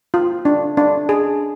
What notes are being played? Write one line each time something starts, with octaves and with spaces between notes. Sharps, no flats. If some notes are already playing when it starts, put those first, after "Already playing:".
F4
D4
D4
G#4